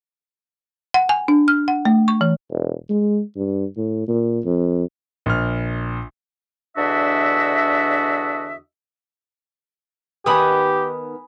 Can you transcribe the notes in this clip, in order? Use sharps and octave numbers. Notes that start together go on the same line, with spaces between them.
F#5
G#5
D4
F6
F#5
A3
C#6
E3
E1
G#3
G2
A2
A#2
F2
A#1 F6
E2 D3 D4 F#4 D#5 E5
D#3 B3 G4 B4 G#5 B5 D#6